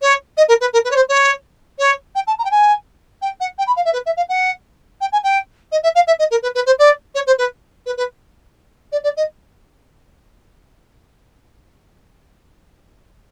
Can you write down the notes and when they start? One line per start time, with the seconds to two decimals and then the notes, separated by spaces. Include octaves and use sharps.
0.02 C#5
0.37 D#5
0.48 A#4
0.61 B4
0.73 A#4
0.85 B4
0.91 C#5
0.96 C5
1.09 C#5
1.79 C#5
2.15 G5
2.27 A5
2.39 A#5
2.45 G5
2.51 G#5
3.22 G5
3.40 F#5
3.58 G5
3.67 B5
3.76 F5
3.85 E5
3.93 B4
4.06 E5
4.17 F5
4.29 F#5
5.01 G5
5.12 G#5
5.24 G5
5.72 D#5
5.83 E5
5.95 F5
6.07 E5
6.19 D#5
6.31 A#4
6.43 B4
6.55 B4
6.66 C5
6.79 D5
7.15 C#5
7.27 C5
7.38 B4
7.86 B4
7.97 B4
8.92 D5
9.04 D5
9.17 D#5